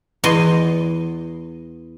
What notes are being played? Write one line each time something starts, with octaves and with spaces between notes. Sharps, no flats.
E2 D#5 C6